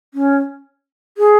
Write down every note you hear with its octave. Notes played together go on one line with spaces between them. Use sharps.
C#4
G#4